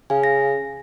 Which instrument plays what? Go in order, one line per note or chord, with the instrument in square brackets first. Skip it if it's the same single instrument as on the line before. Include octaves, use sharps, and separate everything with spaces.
[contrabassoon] C#3 [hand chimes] F5 G#5
[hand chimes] A#6